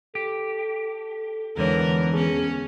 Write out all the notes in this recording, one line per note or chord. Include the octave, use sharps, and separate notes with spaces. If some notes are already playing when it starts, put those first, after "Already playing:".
G4 A4
E2 D3 E3 G#3 B3 A#4 C#5
B3 C#4 G#4